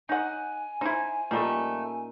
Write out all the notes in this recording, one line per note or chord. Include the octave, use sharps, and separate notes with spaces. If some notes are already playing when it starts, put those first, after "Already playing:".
D#4 C#5 D#5 F#5 G#5
D#4 E4 C5
A#2 F3 G3 A3 C#4 D#4